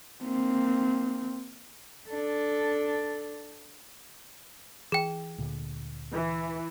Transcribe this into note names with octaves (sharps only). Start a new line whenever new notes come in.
A#3 C4
D4 A4
E3 G#4 G5
D2 A#2 D3
E3